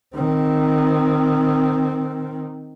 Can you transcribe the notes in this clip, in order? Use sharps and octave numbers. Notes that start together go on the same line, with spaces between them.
D#3 C4